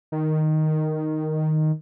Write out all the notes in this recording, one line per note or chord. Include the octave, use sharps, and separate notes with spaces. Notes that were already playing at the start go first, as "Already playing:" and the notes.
D#3